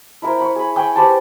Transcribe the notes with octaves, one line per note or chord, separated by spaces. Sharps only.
E4 A#4 C5
B5 C#6
G#4 B5
G5 G#5 B5 C#6
G4 B4 C5 A5